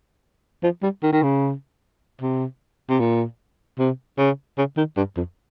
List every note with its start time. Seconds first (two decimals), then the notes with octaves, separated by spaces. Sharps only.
0.63 F3
0.82 G3
1.03 D#3
1.13 D#3
1.23 C#3
2.21 C3
2.89 C3
3.00 A#2
3.78 C3
4.18 C#3
4.58 C#3
4.77 D#3
4.97 G2
5.17 F2